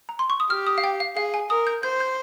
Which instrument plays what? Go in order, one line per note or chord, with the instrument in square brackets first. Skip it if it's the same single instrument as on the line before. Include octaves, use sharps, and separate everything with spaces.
[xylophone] A#5
C6
C#6
D#6
[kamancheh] G4 [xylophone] F6
[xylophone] D#6
F5
G5
F5
[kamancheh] G#4 [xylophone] F5
[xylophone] G#5
[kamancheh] A#4 [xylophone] D#6
[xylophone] G6
[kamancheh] C5 [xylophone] G6
[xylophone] G6